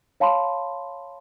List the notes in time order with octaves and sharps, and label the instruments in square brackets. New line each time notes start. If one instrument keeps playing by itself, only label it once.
[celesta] C#5 F5 A5 B5 C6